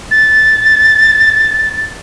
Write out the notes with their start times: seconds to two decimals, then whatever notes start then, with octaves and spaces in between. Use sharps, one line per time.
0.11 A6